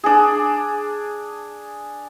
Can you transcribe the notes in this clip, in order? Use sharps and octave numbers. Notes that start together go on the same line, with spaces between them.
D4 G#4